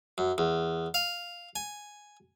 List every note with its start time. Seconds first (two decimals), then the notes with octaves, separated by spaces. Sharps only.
0.18 F#2
0.38 E2
0.94 F5
1.56 G#5